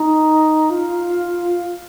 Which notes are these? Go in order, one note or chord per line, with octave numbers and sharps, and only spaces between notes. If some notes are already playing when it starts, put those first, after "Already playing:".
Already playing: D#4
F4